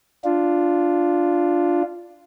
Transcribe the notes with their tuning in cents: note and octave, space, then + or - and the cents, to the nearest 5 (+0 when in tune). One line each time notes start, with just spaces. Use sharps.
D4 +0 F4 -5